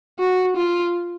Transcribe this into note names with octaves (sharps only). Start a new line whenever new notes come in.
F#4
F4